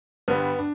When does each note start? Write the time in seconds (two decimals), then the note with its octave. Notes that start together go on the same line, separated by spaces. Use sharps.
0.28 G2 D3 G3 B3
0.59 D4